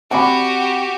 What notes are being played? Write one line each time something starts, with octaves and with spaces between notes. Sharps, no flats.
C4 F#4 G4 D5 F#5 G#5 B5